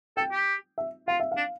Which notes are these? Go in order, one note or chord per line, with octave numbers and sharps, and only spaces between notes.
A4 G5
G4
E5
F4 F5
E5
F5
D4